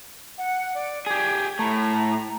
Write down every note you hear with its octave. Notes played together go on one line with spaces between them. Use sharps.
F#5
D5
G4 G#4 G#6
A2 A3 A#5